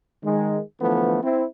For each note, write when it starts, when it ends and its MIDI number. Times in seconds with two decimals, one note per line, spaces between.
0.24 0.60 51
0.24 0.60 56
0.81 1.18 50
0.81 1.18 52
0.81 1.18 53
0.81 1.18 57
0.81 1.18 59
1.22 1.44 60
1.22 1.44 64